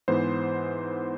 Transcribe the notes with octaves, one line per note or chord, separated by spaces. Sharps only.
G#2 E3 B3 C5